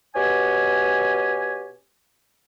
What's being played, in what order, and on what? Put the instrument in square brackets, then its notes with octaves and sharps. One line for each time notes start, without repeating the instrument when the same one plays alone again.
[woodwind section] B2 C#4 G4 G#5